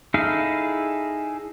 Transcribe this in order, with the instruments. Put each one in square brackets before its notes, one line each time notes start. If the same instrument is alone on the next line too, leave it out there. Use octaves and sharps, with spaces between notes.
[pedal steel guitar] D#4 E4 G#4 A4 F5